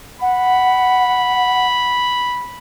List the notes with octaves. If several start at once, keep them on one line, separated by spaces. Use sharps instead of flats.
F#5 B5